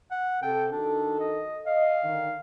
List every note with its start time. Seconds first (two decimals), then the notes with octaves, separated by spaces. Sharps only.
0.11 F#5
0.42 C3 A4 G5
0.72 D#3 D4 F#4 A4
1.20 D#5
1.66 D#5 F5
2.03 D3 D#3